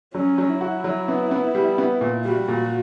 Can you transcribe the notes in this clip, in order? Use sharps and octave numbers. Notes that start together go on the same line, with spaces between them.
F#3 C#4
F#3
E4
F#4
F#3
B3
B3
G3
B3
A#2
G3 F#4
A#2